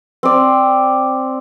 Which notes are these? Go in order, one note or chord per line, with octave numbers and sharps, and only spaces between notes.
C4 D5